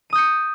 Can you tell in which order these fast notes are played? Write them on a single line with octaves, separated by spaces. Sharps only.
D#7 D#6 G6 C#7